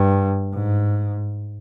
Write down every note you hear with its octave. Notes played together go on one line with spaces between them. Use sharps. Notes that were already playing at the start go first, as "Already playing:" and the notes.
Already playing: G2
G#2